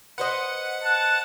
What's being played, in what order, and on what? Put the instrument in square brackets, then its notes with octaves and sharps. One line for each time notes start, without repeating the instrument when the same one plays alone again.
[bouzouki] B4 C5 D#5 [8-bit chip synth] F#5
[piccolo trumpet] A5 [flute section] F#6